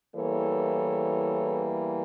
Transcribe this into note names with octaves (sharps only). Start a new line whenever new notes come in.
E2 E3 G3 A#3 A4 C#5